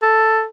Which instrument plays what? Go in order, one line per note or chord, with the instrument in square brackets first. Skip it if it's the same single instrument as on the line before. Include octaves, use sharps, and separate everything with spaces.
[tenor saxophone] A4